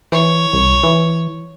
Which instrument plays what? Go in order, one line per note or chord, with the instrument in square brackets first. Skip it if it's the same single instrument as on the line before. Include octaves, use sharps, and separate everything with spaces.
[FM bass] E3 [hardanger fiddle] C#5
[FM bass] C2
E3